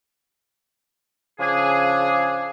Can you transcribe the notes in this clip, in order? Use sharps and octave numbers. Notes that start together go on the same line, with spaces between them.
C#3 F3 D4 G#4